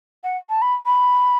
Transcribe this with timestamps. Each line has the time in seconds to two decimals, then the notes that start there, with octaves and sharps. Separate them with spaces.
0.24 F#5
0.49 A5
0.62 B5
0.86 B5